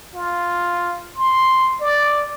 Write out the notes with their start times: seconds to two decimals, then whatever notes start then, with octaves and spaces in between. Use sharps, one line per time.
0.15 F4
1.16 C6
1.81 D5